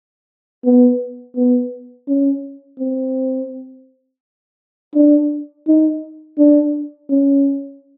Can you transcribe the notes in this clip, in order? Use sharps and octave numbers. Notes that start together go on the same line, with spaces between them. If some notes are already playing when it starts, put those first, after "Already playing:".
B3
B3
C#4
C4
D4
D#4
D4
C#4